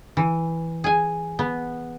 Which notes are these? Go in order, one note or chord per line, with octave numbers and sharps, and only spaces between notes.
E3
G#4 G#5
B3